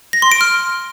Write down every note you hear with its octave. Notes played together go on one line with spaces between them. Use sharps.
A#6
C6
D7
F6